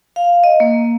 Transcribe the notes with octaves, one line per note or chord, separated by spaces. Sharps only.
F5
D#5
A#3